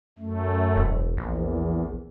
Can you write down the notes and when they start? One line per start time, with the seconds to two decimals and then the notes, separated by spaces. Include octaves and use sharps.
0.19 F#2 A3
0.76 E1
1.17 A#1 E2